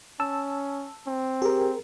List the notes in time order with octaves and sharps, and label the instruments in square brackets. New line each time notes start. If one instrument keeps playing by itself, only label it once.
[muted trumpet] C#4 [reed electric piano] A5 E6
[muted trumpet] C4
[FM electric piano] G4 [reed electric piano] G#4 A#4